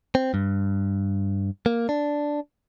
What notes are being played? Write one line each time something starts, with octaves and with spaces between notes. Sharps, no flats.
C4
G2
A#3
D4